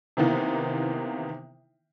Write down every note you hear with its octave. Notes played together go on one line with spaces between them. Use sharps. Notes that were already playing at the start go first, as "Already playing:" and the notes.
C3 D#3 E3 A#3 B3 D#4